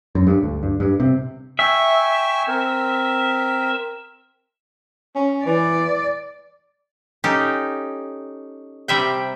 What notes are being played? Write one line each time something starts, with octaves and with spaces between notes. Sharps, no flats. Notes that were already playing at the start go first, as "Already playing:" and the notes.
F#2
G2
D2
G2
G2
C3
E5 G5 G#5 C#6
C4 A#4
C#4
E3 D5
C#4 D#4 G4 A4
C3 G3 E5 G5